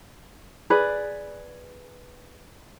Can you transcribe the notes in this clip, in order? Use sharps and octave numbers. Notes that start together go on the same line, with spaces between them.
G#4 B4 D5